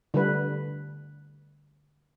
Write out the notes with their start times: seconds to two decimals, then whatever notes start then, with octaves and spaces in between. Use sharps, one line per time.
0.14 D3 G3 B4